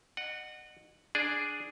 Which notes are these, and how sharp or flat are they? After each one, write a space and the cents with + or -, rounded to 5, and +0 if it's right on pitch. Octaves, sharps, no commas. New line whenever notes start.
D#5 -35 F#5 +0
D4 +0 G#4 +0 D5 +0